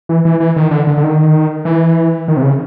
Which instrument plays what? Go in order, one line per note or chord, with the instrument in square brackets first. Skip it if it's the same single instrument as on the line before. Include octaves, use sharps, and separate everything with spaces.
[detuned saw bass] E3
E3
E3
D#3
D3
D3
D3
D#3
E3
D#3
C3
C#3